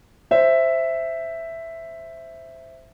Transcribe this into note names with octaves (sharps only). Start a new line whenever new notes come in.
C5 E5